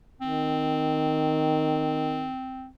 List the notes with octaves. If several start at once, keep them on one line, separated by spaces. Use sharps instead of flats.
D#3 C4